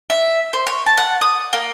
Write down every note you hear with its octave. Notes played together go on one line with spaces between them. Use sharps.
E5
C5
C#5
A5
F#5
D#6
A#3